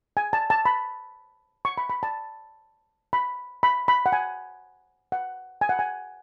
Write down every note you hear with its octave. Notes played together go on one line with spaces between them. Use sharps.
G#5
A5
A5
B5
C#6
B5
B5
A5
B5
B5
B5
F#5
G#5
F#5
G#5
F#5
G#5